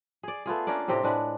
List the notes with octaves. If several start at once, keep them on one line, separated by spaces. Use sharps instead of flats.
G#4 D5
A3 B3 F4 G#4
A#3 C#4 D4 D5
A2 C3 C4 G4
A2 G#3 D4 B4